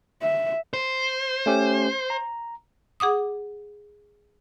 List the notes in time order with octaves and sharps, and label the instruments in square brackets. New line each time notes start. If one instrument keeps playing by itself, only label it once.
[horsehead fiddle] E5
[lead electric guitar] C5
[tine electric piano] A3 C#4 G4
A#5
[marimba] G#4 F#5 D6 D#6